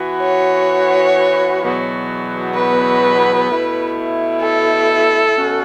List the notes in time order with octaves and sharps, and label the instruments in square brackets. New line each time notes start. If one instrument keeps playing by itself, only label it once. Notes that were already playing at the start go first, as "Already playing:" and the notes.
Already playing: [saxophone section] E3 B3 F#4
[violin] C#5
[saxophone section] E2 B2 F#3 B3 F#4
[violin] B4
[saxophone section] B2 A3 E4
[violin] A4
[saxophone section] B2 A3 C#4 F#4